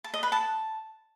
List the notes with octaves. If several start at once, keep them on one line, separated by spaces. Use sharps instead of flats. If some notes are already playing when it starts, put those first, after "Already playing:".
A5
D#5
B4
A5